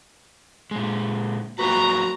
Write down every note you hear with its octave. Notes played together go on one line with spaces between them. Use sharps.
A#2 G#3
F#3 A#3 F#4 B4 A#5